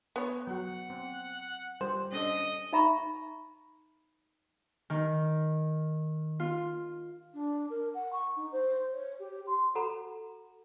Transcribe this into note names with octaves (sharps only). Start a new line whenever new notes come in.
B3 C#5
F#3 F#4 F#5
C4
G3 F4 G4 C5
C#4 D4 A4 D#5
D#4 E5 A#5 B5 C#6
D#3
F4
D4
A#4
F#5
C#6
D#4
C5
C#5
G4
C6
F#4 A4 F#5 A#5 B5